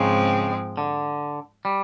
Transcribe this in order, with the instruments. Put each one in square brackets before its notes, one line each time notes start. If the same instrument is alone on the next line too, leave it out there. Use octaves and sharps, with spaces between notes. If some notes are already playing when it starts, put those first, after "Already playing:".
Already playing: [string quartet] G#2 F3 G#3 C4 [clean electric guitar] C#3
[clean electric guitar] D3
G3